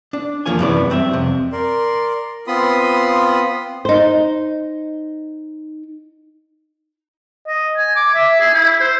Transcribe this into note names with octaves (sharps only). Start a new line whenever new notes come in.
D4
E2 F3 A#3 F4 C#5 G#5
F#2 C3 E3 B3 A#4 D5
G2 C4 B4 E5
F2 C3
A#4 D5 C6
B3 C4 F4 B5 C6 D#6
D#4 C5
D#5
G#5
D6
E5
G#4
E4
C5